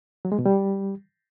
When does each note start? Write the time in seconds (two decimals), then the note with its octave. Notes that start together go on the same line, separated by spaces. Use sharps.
0.25 F#3
0.32 G#3
0.39 B2
0.46 G3